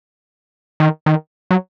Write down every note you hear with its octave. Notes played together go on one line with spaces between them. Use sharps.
D#3
D#3
F#3